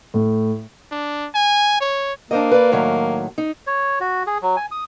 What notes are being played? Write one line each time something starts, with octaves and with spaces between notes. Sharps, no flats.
A2
D4
G#5
C#5
A#3 D4 C5 D#5
B4 D5
A2 D#3 F#3
D#4
C#5
F#4
G#4
F#3
G#5
D#6